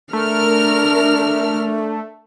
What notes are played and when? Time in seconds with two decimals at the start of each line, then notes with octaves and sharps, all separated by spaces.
0.13 A3 D4 A#4 F6